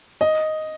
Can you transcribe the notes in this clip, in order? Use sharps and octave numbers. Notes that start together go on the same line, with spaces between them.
D#5